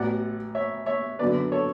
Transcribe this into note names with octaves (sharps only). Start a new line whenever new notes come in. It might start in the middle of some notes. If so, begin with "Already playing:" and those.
Already playing: A1 A2 F#3 B3 D5 F#5
C#5 E5
C#5 E5
F#2 D3 F#3 B3 B4 D5
A4 C#5